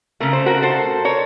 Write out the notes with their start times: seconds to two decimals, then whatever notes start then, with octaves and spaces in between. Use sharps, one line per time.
0.20 C#3 A3 A#4
0.33 C5
0.46 F#4 A#4
0.62 A4 C5
1.05 A#4 C#5